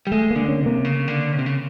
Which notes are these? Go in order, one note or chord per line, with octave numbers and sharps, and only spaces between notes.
G3
G#3 A3
A#3
D3
C#4
C3
A#3
C#3
D3
C#3
C3
C#3